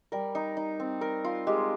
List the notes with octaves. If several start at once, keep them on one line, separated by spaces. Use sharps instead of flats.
G3 A#4
D#4
D#4
C4
A#4
F4
G#3 G4